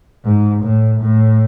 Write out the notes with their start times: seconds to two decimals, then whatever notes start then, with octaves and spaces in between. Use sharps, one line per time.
0.24 G#2
0.63 A2
1.01 A2